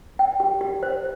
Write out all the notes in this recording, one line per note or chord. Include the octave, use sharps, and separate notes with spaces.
G5
G4
G4
C5